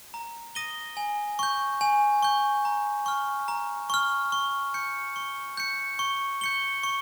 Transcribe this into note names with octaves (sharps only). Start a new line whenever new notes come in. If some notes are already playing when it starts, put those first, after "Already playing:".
A#5
D#6 A#6 D#7 G7
G#5
C#6 G6
G#5
C#6 G6
A#5
C#6 F6
A#5
C#6 F6
C#6
G6 C#7
C#6
G6 C#7
C#6
G6 C#7 G7
C#6